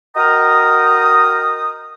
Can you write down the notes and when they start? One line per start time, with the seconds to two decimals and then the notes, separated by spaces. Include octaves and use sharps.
0.15 F#4 A#4 D#5 G5 A#5 D#6